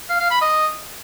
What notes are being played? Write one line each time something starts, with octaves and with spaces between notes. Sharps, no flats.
F5
F5
B5
D#5